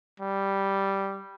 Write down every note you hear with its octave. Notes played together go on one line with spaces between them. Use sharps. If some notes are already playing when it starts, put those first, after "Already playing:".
G3